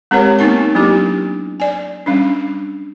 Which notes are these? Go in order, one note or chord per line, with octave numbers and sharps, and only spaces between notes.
G#3 C4 G4 A#4 C#5
A#3 B3 D#4 A#4 A5
F#3 A#3 D4 E4 G4
D5 G#5
G3 C#4 D4